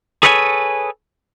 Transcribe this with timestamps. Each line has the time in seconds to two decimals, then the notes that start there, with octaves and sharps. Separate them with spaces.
0.23 G#4 A4 B4 C#5 F5 G#5